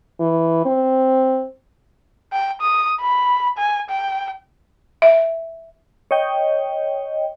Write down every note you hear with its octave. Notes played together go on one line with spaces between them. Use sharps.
E3
C4
G5
D#6
B5
G#5
G5
E5
C#5 D#5 G5